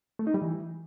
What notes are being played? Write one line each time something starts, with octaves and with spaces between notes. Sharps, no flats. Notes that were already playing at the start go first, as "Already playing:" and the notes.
A3
D#4
G3
E3